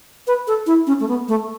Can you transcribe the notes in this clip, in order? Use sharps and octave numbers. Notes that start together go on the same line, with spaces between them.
B4
A4
E4
C#4
A3
B3
A3